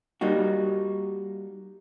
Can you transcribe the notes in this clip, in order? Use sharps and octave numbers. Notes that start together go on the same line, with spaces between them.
G3 A#3 D#4 F#4